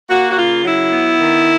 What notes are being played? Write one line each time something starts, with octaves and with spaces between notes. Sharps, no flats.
A#3 F#4
F#4
C#3 F4
F#3 E4
B3
D#3